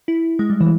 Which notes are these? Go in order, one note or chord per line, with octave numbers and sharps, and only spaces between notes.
E4
G#3
G3
E3